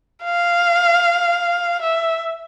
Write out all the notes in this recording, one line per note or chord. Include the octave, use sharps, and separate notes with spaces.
F5
E5